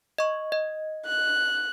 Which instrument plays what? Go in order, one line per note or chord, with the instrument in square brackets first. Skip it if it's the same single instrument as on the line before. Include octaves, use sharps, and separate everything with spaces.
[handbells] D#5 C#6
D#5
[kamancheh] F#6